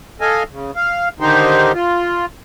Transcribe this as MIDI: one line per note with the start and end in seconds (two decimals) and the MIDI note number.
0.21 0.43 69
0.21 0.43 75
0.21 0.43 77
0.21 0.43 80
0.52 0.71 49
0.76 1.09 77
1.20 1.72 50
1.20 1.72 51
1.20 1.72 63
1.20 1.72 67
1.20 1.72 72
1.74 2.26 65